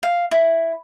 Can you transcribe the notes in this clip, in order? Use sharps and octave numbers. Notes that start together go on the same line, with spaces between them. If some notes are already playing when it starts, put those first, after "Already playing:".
F5
E4